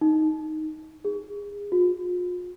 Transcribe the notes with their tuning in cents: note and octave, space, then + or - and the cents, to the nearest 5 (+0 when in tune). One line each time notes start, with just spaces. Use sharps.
D#4 +5
G#4 -30
F4 +40